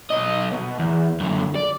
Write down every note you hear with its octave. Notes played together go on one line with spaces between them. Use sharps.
B1 D#5
B2
E2
F#2 D3
D5